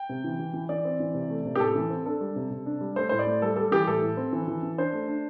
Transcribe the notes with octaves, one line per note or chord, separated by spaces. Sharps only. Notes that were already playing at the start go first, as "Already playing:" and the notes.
Already playing: G5
C3
E3
E3
E3
E3 D5
C4
E3
C3
A3
C3
G4
A2 A4
E3
C4
D4 A4
G3
C3
C3
D4
G3
A3 C5
A2 C5
D5
A3
G3 A4
G3 A4
E3 G4
A2 A4
A2
C4
E3
E3
E3
D4 C5
A3
D4